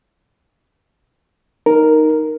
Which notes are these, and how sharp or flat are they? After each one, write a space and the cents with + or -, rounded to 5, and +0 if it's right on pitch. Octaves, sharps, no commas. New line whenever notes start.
D#4 +0 A#4 +0